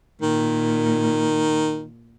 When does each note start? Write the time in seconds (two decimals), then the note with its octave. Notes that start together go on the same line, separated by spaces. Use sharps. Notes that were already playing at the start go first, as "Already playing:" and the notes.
0.22 A#2 D#3